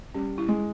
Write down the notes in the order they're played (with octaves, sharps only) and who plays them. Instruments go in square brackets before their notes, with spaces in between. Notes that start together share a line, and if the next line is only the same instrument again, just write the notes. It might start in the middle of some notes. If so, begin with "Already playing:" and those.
[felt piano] G3 [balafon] C#4
[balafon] E4
[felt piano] G#3